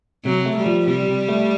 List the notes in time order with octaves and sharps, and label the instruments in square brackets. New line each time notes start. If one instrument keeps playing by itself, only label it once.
[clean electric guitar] C3 [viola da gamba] F#3
[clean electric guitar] A3
[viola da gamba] G3
[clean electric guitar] F3
[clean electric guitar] C3 [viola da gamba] G3
[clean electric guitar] C3
A3